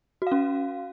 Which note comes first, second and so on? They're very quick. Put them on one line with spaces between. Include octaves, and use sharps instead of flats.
F#4 F5 C#4